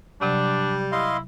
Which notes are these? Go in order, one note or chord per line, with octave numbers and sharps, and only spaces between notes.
C3 F#3 G3 D4
E4 D#5 F5 C6